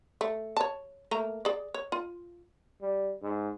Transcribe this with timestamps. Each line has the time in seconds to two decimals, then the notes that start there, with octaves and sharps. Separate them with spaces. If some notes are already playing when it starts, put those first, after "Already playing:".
0.21 A3
0.57 C#5 A5
1.11 A3 A#3 A#5
1.45 G#4 D5
1.74 C#5
1.92 F4
2.82 G3
3.22 G#2